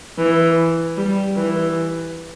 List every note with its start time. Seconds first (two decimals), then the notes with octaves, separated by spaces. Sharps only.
0.18 E3
0.97 G3
1.36 E3